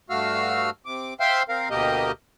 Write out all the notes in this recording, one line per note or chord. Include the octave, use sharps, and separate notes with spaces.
G2 A3 F#4 F5 E6 F6
C3 D6
C5 E5 F5 G5 C6
C4 A#4 F5
D2 B2 A#3 G4 A#4 D#5